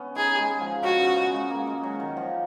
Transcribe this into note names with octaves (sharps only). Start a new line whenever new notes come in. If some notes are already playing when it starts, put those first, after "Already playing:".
Already playing: B3 C#4
D#4 G#4
G#3
F3
C#3 F#4
B2
C#3
G#3
A#3
G#3
F#3
D#3
F3